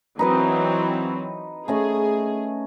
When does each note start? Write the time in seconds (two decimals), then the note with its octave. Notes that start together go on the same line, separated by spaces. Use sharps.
0.19 E3 F#3 C4 D#4 B4 D#5
1.68 A3 C#4 G#4 D#5